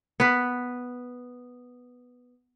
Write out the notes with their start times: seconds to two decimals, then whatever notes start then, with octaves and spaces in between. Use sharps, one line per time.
0.20 B3 B4